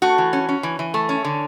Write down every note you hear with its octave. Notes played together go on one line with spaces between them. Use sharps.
A3 F#4
E3
C#4
C#4
E3
E3
A3
C#4
D3